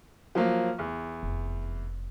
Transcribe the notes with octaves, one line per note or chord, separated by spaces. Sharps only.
F3 F#3 A#3
E2
F1